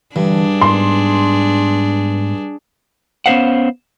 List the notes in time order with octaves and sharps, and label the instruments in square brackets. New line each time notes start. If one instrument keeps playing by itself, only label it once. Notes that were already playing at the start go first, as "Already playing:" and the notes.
[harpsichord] G2 [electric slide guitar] D3 E3 [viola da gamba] D4 G#4
[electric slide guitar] G#2 B3 [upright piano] C6
[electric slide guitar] B3 C#4 B4 C5 F5 F#5